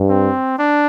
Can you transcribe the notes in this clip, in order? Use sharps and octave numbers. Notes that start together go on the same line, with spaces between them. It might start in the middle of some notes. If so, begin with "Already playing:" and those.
Already playing: G2
C4
D4